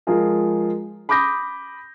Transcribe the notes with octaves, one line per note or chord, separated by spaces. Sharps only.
F3 G#3 F4 G#4 A#4
B5 D6 D#6 G6 A#6